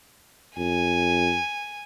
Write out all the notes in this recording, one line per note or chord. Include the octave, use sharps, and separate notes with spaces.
F2 G#5